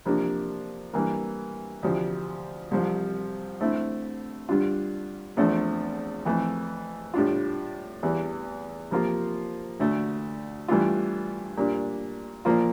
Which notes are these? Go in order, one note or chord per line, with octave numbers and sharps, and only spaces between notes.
C3 F3 A#3 D4
G2 E3 A#3
D2 C3 F3
C2 C3 F3
D3 A3 C4 E4
G2 D3 G3 D4 F4
E2 D3 F3 A3 C4
F2 E3 A3
A2 G3 D4 F4
E2 E3 G3
C3 F3 A#3 F4
D2 D3 A3
G2 E3 A3 D4 F4
A#2 G3 D4
A#2 F3 A#3 F4